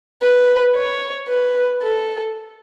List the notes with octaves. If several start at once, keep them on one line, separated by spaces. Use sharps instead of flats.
B4
C#5
B4
A4